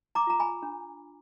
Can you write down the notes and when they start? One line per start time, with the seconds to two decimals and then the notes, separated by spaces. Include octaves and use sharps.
0.15 A#5 D6
0.27 F4 A#5
0.39 G#5 B5
0.63 D4